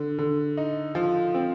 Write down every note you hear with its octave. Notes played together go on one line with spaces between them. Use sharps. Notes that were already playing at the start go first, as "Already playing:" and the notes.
Already playing: D3
D3
D#4
F3
C4